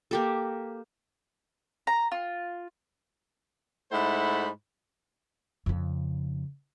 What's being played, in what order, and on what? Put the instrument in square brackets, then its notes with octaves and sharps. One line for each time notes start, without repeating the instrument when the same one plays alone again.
[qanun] A#3 G4 A4
[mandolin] A#5
F4
[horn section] G#2 A3 E4 C5 F#5 B5
[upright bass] F2 C#3